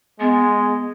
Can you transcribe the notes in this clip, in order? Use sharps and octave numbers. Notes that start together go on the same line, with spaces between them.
G#3 B3